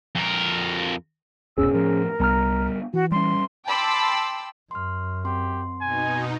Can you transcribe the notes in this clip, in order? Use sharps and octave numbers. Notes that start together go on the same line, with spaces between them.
F2 A#4
F1 C2 B2 C#4 G#4 E6
A2 F3 A#4
C2 G3 B3 A#5 F6
E3 F#4
G3 C#4 C6
G5 A5 B5 C6 D6 E6
F#2 C6 F6
C4 G4 C6
B2 D#4 G#5